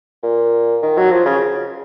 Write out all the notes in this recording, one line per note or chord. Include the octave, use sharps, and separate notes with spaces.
A#2
D#3
F#3
F3
C#3